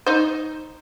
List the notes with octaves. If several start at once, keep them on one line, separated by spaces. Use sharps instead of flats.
D#4 C5